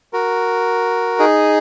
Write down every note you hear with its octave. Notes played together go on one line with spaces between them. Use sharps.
F#4 A#4
D#4 G#4